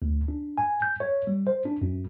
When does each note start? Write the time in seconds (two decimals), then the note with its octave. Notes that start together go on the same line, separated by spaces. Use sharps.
0.02 D2
0.28 D4
0.58 G#5
0.82 G6
1.00 C#5
1.27 G3
1.47 C5
1.65 D4
1.81 F#2